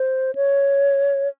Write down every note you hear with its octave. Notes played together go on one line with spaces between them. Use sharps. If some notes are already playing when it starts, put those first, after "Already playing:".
Already playing: C5
C#5